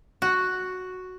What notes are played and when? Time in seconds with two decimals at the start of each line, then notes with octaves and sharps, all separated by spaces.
0.22 F#4